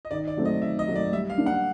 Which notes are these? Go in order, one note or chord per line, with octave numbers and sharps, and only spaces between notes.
D#5
D#3 D5
D5
F#3 A3 C4
D#5
D#3 E5
D#5
F#3 A3 C4
D5
G3 E5
F5
A#3 D4
F#5